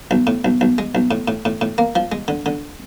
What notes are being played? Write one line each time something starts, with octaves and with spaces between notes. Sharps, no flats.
B1
A2
B1
B1
G#3
B1
A2
A2
A2
A2
A#3
F3
G#3
D3
D3